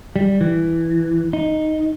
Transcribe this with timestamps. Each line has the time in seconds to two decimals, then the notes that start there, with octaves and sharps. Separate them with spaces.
0.16 G3
0.41 E3
1.33 D#4